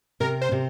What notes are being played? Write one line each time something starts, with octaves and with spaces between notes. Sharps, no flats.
C3 A#4
C5
C3